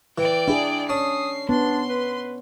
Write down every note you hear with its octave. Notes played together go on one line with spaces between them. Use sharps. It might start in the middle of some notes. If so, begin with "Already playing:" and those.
E3 D5 G5
D4 E4 G#4
C#4 A5 D#6 C7
B3 D4 C6
B4